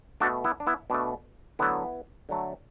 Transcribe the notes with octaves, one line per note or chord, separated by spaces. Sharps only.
B2 A3 D4 F#4
B3 E4
D4
B3 E4
B2 A3 D4
D3 F#3 A3 B3 E4
D3 F#3 A3